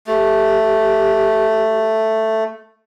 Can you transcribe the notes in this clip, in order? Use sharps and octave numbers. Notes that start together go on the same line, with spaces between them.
A3 G4